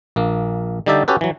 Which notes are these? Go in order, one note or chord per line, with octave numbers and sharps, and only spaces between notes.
A#1 A#3
D3 G3 D#4 G4 E5 A5
C#4 F#4 G4 A4 B4
E3 F#3